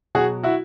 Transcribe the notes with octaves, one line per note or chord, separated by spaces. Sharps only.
B2 F#3 F#4 G#4
E4 F#4